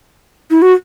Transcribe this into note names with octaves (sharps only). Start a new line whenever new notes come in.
E4
F#4